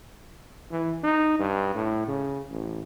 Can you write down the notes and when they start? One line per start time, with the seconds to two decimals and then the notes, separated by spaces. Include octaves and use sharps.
0.71 E3
1.04 D#4
1.39 G2
1.75 A2
2.07 C#3
2.51 A1